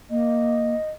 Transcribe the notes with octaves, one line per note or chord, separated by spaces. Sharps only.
A#3 D#5